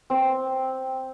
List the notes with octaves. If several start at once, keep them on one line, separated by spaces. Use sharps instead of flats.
C4